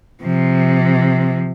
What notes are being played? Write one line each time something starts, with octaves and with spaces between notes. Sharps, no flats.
C3 F3